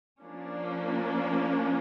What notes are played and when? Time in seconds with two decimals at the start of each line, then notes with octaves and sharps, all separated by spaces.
0.24 F3 A#3 C#4 D4